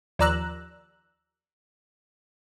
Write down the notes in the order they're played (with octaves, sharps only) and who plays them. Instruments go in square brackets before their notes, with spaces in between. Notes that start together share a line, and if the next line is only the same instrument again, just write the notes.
[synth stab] D#2 F3 D5 A#5 E6 F#6